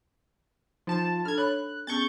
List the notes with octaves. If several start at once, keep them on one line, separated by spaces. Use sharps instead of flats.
F3 D#4 A5
D4 A4 F6 G#6
C#5 B5 F#6
B3 C#4 G#4 C#6 G6 A6